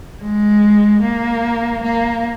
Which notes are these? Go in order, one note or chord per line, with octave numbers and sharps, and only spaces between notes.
G#3
A#3
A#3